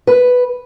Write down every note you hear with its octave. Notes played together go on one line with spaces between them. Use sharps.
B4